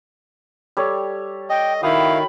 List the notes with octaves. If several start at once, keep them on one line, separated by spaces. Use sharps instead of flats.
G3 A4 C#5
D#5 G5
D#3 E4 F#4 F5 G5 B5 D#6